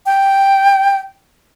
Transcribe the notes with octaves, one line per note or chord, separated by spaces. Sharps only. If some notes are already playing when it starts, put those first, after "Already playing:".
G5